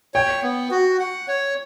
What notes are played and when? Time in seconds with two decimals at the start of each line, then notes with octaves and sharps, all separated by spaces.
0.14 C#5 G5
0.42 B3
0.71 F#4
1.00 F#5
1.28 C#5